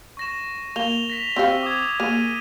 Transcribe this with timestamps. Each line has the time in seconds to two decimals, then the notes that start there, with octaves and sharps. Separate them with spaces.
0.17 C#6 A#6 E7
0.76 A#3 F7 G7
1.10 A#6 B6 F7
1.36 C4 G4 F5 C#6 E6
1.63 D6 D#6 G#6
2.00 A#3 G#4 D#7